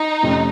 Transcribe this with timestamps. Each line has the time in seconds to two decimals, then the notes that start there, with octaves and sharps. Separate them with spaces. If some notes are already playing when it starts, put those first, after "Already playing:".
Already playing: D#4
0.23 F2 C3 F3 A3 C#4